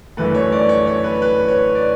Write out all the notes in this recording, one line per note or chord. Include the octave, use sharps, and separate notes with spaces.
G1 F#2 E3 A3 B4
C#5
D5
C#5
C#5
B4
B4
C#5
D5